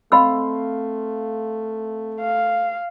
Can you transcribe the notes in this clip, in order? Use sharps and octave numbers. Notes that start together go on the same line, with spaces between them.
A3 C4 D#5 F5 B5 C6 E6
F5